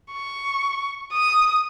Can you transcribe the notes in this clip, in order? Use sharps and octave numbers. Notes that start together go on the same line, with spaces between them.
C#6
D#6